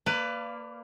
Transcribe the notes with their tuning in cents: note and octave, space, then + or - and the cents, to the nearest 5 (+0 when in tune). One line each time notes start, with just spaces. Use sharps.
A#3 -20 B4 +20 D5 +5